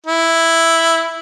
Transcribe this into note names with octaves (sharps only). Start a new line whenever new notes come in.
E4